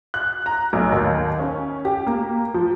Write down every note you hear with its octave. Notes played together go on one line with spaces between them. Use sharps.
F#6
A#5
B1
D#2
C#4
G4
A#3
F3